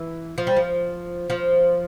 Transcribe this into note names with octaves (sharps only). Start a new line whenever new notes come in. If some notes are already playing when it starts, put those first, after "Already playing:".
Already playing: E3
F3
G3
F3
F3